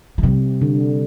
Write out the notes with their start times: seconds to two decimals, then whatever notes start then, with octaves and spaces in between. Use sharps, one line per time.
0.18 F3
0.23 C3 G3
0.62 D3